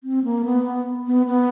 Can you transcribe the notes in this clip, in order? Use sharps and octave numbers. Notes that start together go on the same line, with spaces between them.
C4
A#3
B3
B3
B3